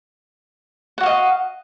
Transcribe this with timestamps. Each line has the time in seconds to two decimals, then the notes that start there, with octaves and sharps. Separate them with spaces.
0.98 F#5
1.01 F#4
1.03 F5
1.06 D#5